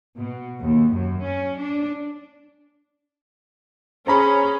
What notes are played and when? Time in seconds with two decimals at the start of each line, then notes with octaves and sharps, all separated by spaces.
0.19 B2
0.61 D#2
0.93 F#2
1.23 C#4
1.59 D4
4.07 C#4 G#4 C5 A#5 B5